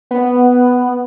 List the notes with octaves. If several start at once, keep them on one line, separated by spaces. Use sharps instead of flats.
B3